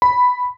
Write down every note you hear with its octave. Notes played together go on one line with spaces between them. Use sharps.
B5